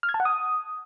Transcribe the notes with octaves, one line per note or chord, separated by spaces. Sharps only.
F6
G#6
A5
F#5
D#6